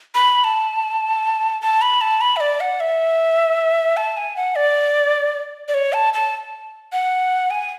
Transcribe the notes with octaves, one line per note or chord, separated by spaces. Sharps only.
B5
A5
A5
B5
A5
B5
E5
D5
F#5
E5
A5
G#5
F#5
D5
D5
C#5
A5
A5
F#5
G#5